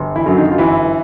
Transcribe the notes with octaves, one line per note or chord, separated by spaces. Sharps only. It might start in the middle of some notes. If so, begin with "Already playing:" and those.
Already playing: G1
E3 E4
F#2 D3 F#3
D#3 D#4
F4
G1 E3 E4